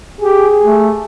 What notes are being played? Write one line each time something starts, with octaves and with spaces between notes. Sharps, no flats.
G4 G#4
A3